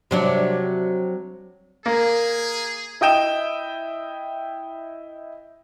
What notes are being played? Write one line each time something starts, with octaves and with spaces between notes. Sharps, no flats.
C3 F#3 D4
A#3 G#4
E4 D#5 G5 E7